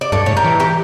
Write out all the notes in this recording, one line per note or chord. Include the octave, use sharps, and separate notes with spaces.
D5
G2 A4 C#5
A2 C#5
G4 A#4
E3
G4 A#4